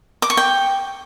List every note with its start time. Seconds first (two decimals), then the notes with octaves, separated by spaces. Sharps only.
0.22 D6
0.30 C#6
0.37 G5